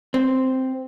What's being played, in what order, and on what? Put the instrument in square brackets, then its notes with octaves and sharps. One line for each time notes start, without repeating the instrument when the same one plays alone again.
[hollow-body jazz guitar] C4